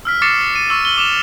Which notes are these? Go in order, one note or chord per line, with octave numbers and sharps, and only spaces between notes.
E6 F6 B6
C#6 D6 A6 C7 C#7 E7
D#7
C#6 E6
F#7 G7
D6 E7 F7